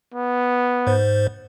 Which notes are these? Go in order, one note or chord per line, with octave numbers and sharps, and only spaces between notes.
B3
G#2 C5